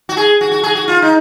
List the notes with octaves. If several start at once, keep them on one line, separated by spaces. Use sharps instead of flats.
F#4
G#4
F#4
F#4
G#4
F#4
F4
D#4